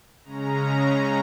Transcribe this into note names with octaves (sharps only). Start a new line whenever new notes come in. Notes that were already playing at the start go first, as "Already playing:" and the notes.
C#3 G#3 C#4 A#5